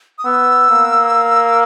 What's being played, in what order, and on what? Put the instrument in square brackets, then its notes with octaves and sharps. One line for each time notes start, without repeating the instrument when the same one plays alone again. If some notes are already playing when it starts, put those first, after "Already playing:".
[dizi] D#6
[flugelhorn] B3 [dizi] E6
[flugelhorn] A#3